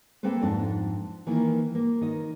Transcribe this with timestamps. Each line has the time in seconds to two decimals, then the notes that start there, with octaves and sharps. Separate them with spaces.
0.23 A#3 C4 A4 B4 C5
0.41 F2 G#2 D4 A5
1.27 D#3 E3 A#3
1.75 A#3
2.01 D#3 D#5